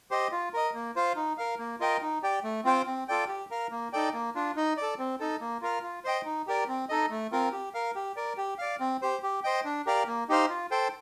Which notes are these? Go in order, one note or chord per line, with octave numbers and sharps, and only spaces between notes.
G4 C5 D#5
F4
A#4 D#5
A#3
F4 C5 F5
D#4
A#4 F5
A#3
F4 A#4 D#5 G5
D#4
G4 D5 G5
A3
C4 F4 C5 G5
C4
F4 A4 D5 G5
G4
A#4 F5
A#3
D#4 A4 D5 G5
A#3
D4 F4
D#4
A4 D5
C4
D#4 A4
A#3
F4 A#4 F5
F4
C5 D#5 G5
D#4
G4 A#4 D5
C4
D#4 A4 D#5
A3
C4 F4 A#4
G4
A#4 F5
G4
A#4 D5
G4
D5 F5
C4
G4 C5
G4
C5 D#5 G5
D4
G4 A#4 D5 F5
A#3
D#4 G4 C5 F5
F4
A4 C5 G5